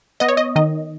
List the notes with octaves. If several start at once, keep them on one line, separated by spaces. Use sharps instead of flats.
B3 D#5
C#5
D#5
D#3 D#5